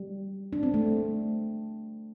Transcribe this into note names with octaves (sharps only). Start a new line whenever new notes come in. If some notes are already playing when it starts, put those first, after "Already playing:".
Already playing: G3
D4
C4
A3